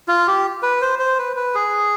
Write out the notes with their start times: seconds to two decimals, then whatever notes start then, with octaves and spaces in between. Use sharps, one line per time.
0.08 F4
0.27 G4
0.63 B4
0.81 C5
0.99 C5
1.18 B4
1.37 B4
1.55 G#4